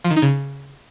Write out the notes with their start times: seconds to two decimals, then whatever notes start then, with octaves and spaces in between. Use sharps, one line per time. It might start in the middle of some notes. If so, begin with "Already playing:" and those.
0.04 F3
0.10 D#3
0.16 D#4
0.22 C#3